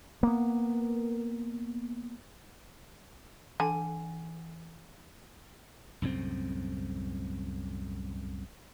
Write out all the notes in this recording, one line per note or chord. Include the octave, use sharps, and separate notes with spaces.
A#3 B3
D3 E3 G#5
C2 F#2 A2 C4